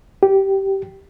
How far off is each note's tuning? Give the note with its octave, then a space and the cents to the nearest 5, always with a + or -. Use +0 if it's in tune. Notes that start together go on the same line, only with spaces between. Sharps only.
G4 -15